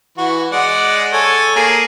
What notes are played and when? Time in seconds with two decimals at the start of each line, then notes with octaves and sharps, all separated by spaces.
0.18 E3 F#4
0.52 G#3 D5 F#5
1.13 A4 C#5 G#5
1.56 A#3 G#4